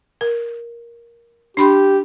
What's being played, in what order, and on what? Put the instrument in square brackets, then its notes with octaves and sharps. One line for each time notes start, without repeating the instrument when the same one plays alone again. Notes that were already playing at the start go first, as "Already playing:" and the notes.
[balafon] A#4
[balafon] D4 B5 C6 [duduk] G4